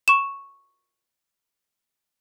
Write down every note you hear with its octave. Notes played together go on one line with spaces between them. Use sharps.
C#6 E7